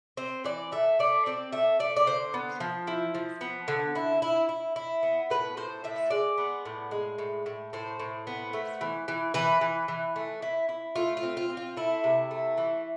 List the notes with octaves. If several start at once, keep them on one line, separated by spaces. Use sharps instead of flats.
C4 C5
E3 D5
A3 E5
A3 D5
C4 D5
A3 E5
A3 D5
D5
D3 C5
B3
F3
E4
F3
B3
D3
E4
E4
E4
E4
B3
A2 B4
A2 C5
A2 E5
G#3 D5
B3
A2
G#3
A2
A2
A2 C5
A2
B3
A3
E3
E3
E3 B4
E3
E3
A3
E4
E4
A3 F4
F4
C4
F4
C4
F4
A3 E4
C3
A3
E3